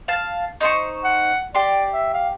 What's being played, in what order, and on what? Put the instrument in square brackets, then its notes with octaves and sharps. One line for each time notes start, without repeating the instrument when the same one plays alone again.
[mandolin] F5 A5
D#4 C5 C#6
[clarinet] F#5
[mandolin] G4 C6 [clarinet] D5
[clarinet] E5
F5